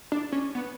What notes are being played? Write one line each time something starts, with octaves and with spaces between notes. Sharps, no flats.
D4
C#4
B3